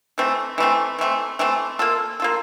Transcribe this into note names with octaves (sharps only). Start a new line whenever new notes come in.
E3 A3 C4
E3 A3 C4
E3 A3 C4
E3 A3 C4
A#3 F4 A4
A#3 F4 A4